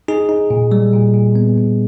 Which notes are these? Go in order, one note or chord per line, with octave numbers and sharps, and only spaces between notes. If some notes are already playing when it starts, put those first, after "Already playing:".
D#4 G#4
D#4
A#2
G3
A#2
A#2
B3
A#2